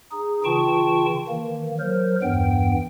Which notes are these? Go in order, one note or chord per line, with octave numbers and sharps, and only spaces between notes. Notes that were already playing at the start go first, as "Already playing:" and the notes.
D#4 G#4
C#3 E3 F4 G5 A5 C#6
D#3 E3 A#3
F#3 A#4 C5
E2 G2 E3 B3 G5